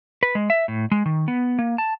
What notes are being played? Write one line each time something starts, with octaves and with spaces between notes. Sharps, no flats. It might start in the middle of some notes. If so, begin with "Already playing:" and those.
B4
G#3
E5
A2
G#3
D#3
B3
A#3
A5